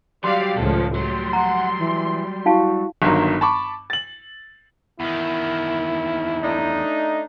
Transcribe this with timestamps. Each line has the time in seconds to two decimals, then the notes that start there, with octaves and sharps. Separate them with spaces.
0.24 F#3 G3 G4 D5 F5 C6
0.57 C#2 A2 D#3 F3 A4
0.95 F#3 G3 C6
1.33 F#5 A#5
1.79 E3
2.46 E4 F#4 F5 A5
3.02 G1 G2 D#3 F#3
3.41 A5 B5 C#6 D6
3.90 A6 F#7
5.00 E2 D#3 E4
6.42 A3 D4 D#4